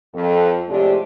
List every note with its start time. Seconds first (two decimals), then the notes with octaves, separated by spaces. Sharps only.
0.14 F2 A4
0.68 F2 A2 C3 G#3 D4 G4